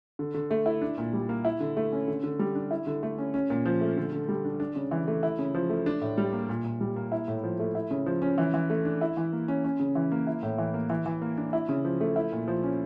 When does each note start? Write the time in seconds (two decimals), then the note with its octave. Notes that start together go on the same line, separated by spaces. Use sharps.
0.19 D3
0.34 D3
0.51 A3
0.66 E4
0.81 D4
0.98 A#2
1.13 G3
1.29 A#3
1.45 E4
1.60 D3
1.77 A3
1.92 C#4
2.08 D3
2.24 D3
2.39 G3
2.55 D4
2.71 E4
2.87 D3
3.03 A3
3.18 C#4
3.34 C#4
3.50 A#2
3.66 F3
3.81 A3
3.97 D3
4.12 D3
4.28 G3
4.45 D4
4.60 D4
4.76 C#3
4.91 E3
5.08 A3
5.23 E4
5.39 C#3
5.55 F3
5.70 A3
5.86 D4
6.01 A2
6.18 G3
6.33 A#3
6.49 A#2
6.65 A#2
6.81 G3
6.96 A#3
7.12 E4
7.28 A2
7.44 F3
7.60 A3
7.75 E4
7.91 C#3
8.06 F3
8.22 C#4
8.38 E3
8.54 E3
8.70 A3
8.85 D4
9.01 E4
9.17 E3
9.33 A#3
9.48 C#4
9.64 C#4
9.80 C#3
9.95 E3
10.12 A#3
10.27 E4
10.43 A2
10.58 E3
10.74 A#3
10.90 E3
11.06 E3
11.22 A#3
11.37 D4
11.53 E4
11.69 C#3
11.85 F3
12.01 A3
12.16 E4
12.32 A#2
12.48 F3
12.63 C#4